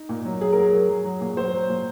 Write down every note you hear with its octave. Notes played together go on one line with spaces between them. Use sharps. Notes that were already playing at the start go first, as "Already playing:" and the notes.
Already playing: D#4
A#2
F#3
F#3 G#4
F#3 A#4
G#4
F#3
F#3
F#3
A#2
F#3 C5
F#3
A#2